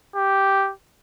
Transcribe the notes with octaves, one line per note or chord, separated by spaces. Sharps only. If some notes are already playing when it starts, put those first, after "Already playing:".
G4